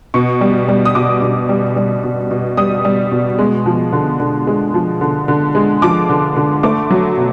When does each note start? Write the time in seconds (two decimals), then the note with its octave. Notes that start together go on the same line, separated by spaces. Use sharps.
0.14 B2 C#6
0.41 G3
0.68 G3
0.85 D#6
0.95 B2 D6
1.22 B2
1.49 G3
1.76 G3
2.04 B2
2.31 B2
2.57 G3 D#6
2.85 G3
3.11 B2
3.39 G#3
3.66 F3
3.93 D3
4.20 D3
4.47 G#3
4.74 F3
5.01 D3
5.28 D3
5.55 G#3
5.82 F3 D6
6.09 D3
6.36 D3
6.63 A3 D6
6.91 F#3
7.17 B2